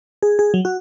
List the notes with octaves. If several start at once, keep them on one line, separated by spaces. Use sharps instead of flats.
G#4
G#4
F#3
F#4